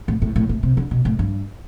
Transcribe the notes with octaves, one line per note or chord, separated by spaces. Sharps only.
A2
A2
A2
A2
C3
D3
B2
A2
G2